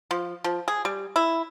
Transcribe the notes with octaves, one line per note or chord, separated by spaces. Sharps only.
F3
F3
G#4
G3
E4